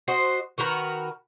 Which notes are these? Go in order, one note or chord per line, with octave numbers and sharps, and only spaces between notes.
F#4 C5 D#5
D#3 F#4 A#4 B4